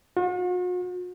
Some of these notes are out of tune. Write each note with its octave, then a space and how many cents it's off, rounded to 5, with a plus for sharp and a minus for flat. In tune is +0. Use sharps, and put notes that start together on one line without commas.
F#4 -45